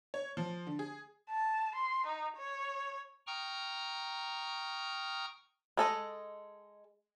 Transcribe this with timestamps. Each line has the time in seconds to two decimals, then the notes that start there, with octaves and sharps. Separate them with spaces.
0.14 C#5
0.37 F3
0.67 D3
0.79 G#4
1.30 A5
1.76 C6
2.07 D#4
2.37 C#5
3.27 G5 A#5 C#6 D#6 F6
5.77 G#3 A4 D#5